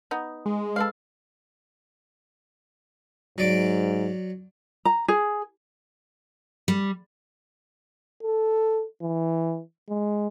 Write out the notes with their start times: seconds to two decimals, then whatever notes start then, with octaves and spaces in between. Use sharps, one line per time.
0.11 B3 D#4
0.46 G#3
0.76 A4 B4 F5
3.38 G#2 F#3 D5 D6
4.85 A#5
5.08 G#4
6.68 G3
8.23 A4
9.02 E3
9.89 G#3